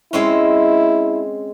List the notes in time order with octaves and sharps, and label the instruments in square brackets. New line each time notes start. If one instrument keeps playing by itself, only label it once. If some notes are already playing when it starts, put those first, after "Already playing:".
[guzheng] G#3 C4 C#4 [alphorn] E4